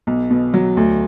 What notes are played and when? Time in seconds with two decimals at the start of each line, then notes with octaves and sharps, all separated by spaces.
0.07 B1
0.31 B2
0.54 F#3
0.77 D2